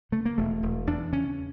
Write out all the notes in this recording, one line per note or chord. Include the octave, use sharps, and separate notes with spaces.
C#3 A3
A#3
E1 A3
E1
E2 D4
C#3 C#4